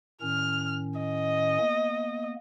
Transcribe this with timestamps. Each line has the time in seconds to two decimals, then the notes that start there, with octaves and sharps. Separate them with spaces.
0.22 A2 D#3 C#4 F6
0.99 D#5
1.59 A#3 B3